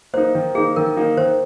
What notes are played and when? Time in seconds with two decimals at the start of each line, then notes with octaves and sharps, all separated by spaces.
0.14 A#3 C5
0.17 D#4
0.35 D#3
0.55 A#3 D#4 G#4
0.76 D#3 A#4
0.97 A#3 D#4
1.17 D#3 C5